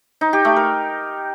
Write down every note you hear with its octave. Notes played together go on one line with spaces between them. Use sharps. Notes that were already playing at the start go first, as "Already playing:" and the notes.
D#4
G4
A3
A#4